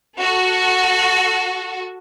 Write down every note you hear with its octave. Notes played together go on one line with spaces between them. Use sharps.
F#4 A4